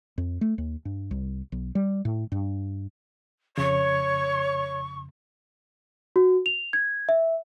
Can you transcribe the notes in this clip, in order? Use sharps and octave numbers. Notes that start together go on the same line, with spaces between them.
F2
A3
D#2
G2
C2
B1
G3
A2
G2
F2 C#3 C#5 C#6
F#4
F7
G#6
E5